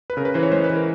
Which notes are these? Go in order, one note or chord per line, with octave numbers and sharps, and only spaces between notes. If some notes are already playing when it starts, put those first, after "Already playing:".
B4
C#3 A#4
B4
E3 C5
C#5
G#3 C5
B4
E3
A#4